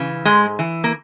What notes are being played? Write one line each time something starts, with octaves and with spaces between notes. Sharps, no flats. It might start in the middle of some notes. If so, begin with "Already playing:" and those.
Already playing: C#3 E3
G#2 G#3
E3
A#3